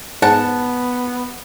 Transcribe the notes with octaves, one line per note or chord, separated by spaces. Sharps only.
G#2 B3 F#5 A5